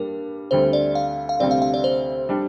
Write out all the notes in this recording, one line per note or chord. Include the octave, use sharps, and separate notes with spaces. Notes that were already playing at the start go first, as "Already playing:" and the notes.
Already playing: G2 G3 A#3 D4 A#4
D2 D3 G3 C4 C5
D5
F5
F5
D2 C3 G3 C4 D5
F5
F5
D5
C5
G3 D4